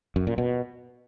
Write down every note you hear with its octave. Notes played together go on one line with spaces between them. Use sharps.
F#2
A#2
B2